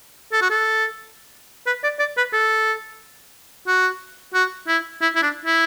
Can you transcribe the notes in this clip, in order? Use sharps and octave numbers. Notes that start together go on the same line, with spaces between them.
A4
F#4
A4
B4
D5
D5
B4
A4
F#4
F#4
E4
E4
E4
D4
E4